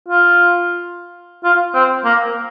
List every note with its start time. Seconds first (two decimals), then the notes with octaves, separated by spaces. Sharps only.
0.08 F4
1.44 F4
1.74 C4
2.05 A#3